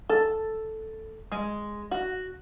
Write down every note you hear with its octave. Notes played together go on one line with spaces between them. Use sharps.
A4
G#3
F#4